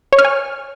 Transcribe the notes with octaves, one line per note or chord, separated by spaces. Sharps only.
C#5
F6
G#5